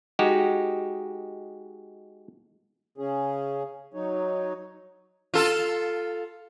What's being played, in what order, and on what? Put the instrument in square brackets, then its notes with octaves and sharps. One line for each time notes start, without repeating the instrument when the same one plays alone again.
[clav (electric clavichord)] G#3 D#4 F#4 G4
[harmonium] C#3 C#4 G#4
F#3 D#4 C#5
[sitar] F4 A4